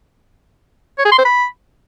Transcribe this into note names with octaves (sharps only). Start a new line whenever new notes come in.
C#5
G#4
C6
C5
B5